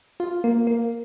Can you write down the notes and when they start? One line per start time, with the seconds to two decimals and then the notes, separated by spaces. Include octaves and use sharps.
0.20 F4
0.44 A#3
0.67 A#3